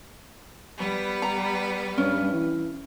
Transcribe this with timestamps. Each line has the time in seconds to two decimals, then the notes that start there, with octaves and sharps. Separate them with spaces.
0.78 G3 B3 B4
1.22 A#5
1.98 G2 C#4
2.33 E3